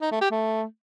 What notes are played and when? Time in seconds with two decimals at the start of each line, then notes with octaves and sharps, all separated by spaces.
0.01 D#4
0.11 A3
0.21 G4
0.31 A3